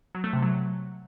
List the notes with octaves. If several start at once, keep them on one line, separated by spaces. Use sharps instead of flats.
F#3
A3
C3
F#3